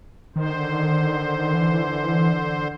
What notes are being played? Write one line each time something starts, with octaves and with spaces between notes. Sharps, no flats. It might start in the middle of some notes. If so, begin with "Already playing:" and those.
D3 D#3 C5
E3